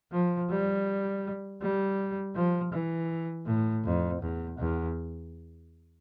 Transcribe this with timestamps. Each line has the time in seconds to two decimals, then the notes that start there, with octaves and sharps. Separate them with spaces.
0.12 F3
0.50 G3
1.62 G3
2.35 F3
2.72 E3
3.46 A2
3.84 F2
4.22 E2
4.58 E2